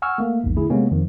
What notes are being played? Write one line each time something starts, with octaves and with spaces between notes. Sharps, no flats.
F#5 G#5 C#6 E6 F6
A3 A#3
A#1 E2 G#2
D3 A3 E4 G#4
C3 G#3 A#3 B3 C#4
F2 D#3 F3